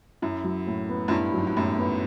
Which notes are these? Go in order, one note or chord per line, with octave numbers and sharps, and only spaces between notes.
F#2 E4
F#3
A2
B3
F#2
G2 E4
G#2 F#3
G2
F#2 A2
B3